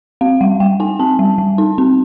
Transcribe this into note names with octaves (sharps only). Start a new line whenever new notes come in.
C4 F5
G3 F#5
G3 G5
D#4 G#5
C4 A5
G3
G3
D#4
C4